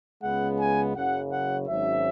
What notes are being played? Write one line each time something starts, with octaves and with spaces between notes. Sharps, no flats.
C#2 C#3 G#3 B3 F#5
G#5
F#1 F#2 C#3 F#5
F#5
G#1 G#2 F#3 C#4 E5